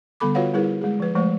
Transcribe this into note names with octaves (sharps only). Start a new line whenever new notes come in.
D3 G3 B3 A4 B5 D6
F4 F#4 B4 C#5 F5 F#5
G3 E4 G#4 A#4 B4
G#3 G#4
F3 B4
F3 G#3 A3 C5